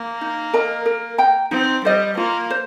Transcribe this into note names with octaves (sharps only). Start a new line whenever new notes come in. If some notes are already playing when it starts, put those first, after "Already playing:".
Already playing: A#3
D#4
A#4 D#5 A#5
A#4
G5 A#5
C4 D#4
G3 C5 D#5
A#3 F4
C5